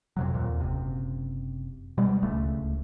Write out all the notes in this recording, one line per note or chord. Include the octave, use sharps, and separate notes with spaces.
F2 C3 F#3
D#2 A#2
F#1 C3
B2 G3 G#3
D1 C#2 A3